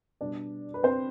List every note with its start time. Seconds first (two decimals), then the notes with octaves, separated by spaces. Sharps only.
0.21 B2 G3 B3 D4 D5
0.74 B4
0.83 C4 C5